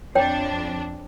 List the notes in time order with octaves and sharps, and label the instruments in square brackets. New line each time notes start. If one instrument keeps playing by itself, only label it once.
[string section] F2 D4 [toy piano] C#5 G5